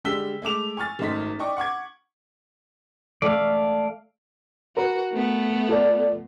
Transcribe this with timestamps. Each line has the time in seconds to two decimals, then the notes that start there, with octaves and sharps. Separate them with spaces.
0.04 D3 G3 G#3 E6 B6 G7
0.42 G#3 A3 D6 F7
0.77 G#5 C#6 F6 A6
0.99 G#1 F#2 A3 D#5 C6 B6
1.39 D5 D#5 G5 C#6 D6
1.57 F#5 C#6 D6 G#6
3.22 A3 D5 F5
4.77 F#4 A#4 B4
5.13 A3 B3
5.69 F4 A4 D5